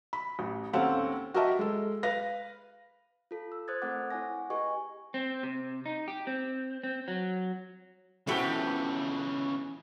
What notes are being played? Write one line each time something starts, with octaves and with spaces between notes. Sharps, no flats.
B5
A1
D#2 C4 C#4 A4 F5 F#5
F#4 G4 A#4 D#5 E5 A5
G#3 A4
B4 F5 A#6
F4 A4
E6
C5 D#6 F#6 G#6 A6
A3 C4 A4 A#4 F#5 D6
E4 C#5 F#5 G#5 A#6
G4 G#4 B4 D#5 G#5 C#6
C4
C3
D#4
G4
C4
C4
F#3
A2 C#3 E3 B3 F#4 G4 A4 B4